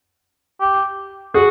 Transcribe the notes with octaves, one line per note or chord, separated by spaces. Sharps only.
G4
F#4 G#4